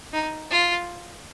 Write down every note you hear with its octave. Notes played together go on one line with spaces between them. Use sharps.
D#4
F4